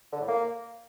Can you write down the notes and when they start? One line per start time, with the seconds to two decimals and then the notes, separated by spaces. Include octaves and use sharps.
0.13 D3
0.21 A2
0.29 A#3